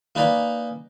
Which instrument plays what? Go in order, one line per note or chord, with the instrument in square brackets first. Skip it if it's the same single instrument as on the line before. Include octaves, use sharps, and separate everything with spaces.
[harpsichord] A#3 D#4 B4 D5 G#5